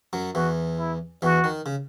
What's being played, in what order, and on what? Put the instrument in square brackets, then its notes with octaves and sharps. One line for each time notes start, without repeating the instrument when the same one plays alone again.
[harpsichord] F#2 F#3
[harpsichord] E2 E3 [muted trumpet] F#4
[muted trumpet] E4
[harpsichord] E2 E3 [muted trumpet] F#4
[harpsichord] D#3
C#3